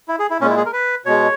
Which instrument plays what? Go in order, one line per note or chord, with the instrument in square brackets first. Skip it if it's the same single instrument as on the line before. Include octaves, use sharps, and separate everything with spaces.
[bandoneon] E4
G#4
E4
A#2 C#4
G#3
E4
G#4
A#4
B4
B2 G#3 C#5